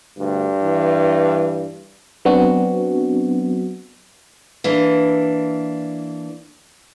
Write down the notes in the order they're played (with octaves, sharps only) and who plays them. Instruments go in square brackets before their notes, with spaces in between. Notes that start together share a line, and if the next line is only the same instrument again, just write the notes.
[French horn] D2 [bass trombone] G2
[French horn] E3
[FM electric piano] F#3 B3 C4 D4 F#4
[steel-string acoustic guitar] E3 A#3 D4